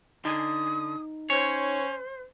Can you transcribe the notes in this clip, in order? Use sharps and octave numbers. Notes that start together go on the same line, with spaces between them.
D3 D#4 D#6
C#4 C5 C#5